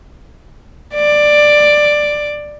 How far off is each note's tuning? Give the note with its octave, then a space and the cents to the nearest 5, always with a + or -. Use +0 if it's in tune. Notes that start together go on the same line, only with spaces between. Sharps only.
D5 +10